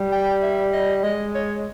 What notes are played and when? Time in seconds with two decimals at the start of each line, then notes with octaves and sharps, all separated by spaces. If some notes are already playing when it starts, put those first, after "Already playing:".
Already playing: G3
0.12 G5
0.42 E5
0.73 D#5
1.03 G#3 D#5
1.35 C#5